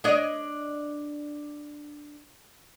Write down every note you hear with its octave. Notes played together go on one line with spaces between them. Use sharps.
D4 C#5 D#5